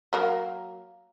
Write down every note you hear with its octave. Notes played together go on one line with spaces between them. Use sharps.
F#3 A#3